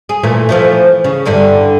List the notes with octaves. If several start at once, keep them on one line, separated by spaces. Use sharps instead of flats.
G#4
A#2 E3 A3
E3 F3 A3
C#3
E2 G2 D3